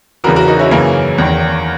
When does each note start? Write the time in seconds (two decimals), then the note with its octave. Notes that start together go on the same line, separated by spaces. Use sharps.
0.24 E2 C#3 E3 F#4 A#4
0.36 F#4 A#4
0.48 D#4 F#4
0.59 C#4 E4
0.71 F#2 C#3 E3 A#3 C#4
1.18 E2 D#3